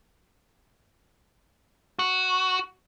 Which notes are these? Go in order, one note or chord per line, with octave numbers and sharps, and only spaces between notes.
F#4